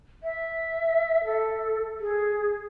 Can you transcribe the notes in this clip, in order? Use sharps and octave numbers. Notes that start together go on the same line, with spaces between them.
E5
A4
G#4